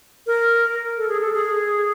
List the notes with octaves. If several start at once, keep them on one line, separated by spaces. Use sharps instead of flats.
A#4
A4
G#4
A4
G#4